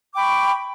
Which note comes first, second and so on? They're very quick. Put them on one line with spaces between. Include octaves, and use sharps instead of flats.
D6 G5 B5 C#6